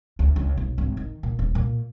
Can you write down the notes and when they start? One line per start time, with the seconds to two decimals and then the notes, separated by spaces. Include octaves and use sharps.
0.19 D2
0.36 C#2
0.57 B1
0.78 G#1
0.97 D#3
1.23 A#2
1.39 D#1
1.55 A#2